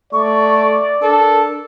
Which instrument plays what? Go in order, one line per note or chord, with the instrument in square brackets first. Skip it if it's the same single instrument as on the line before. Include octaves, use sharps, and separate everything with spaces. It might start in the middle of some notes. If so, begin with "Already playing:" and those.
[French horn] A3 [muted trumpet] D5 [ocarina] C#6
[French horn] D4 [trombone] A4 [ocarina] A#4